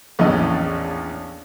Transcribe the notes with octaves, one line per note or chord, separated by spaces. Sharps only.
A#1 E2 A2 C#4 D#5 E5